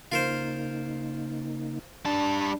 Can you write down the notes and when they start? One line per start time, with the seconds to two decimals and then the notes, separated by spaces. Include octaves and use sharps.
0.12 C#3 A#3 D#4 F4 A#4 C5
2.05 G3 D4 A5